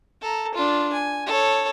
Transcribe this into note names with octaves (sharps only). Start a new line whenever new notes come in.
A4 A#5
D4 F4
G#5
A4 C#5